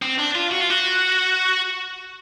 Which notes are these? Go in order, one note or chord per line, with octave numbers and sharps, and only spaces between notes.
C4
D4
F4
F#4
F4
F#4